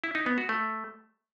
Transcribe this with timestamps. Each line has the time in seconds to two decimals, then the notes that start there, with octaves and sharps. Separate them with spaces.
0.04 E4
0.15 D#4
0.26 B3
0.38 F#4
0.49 A3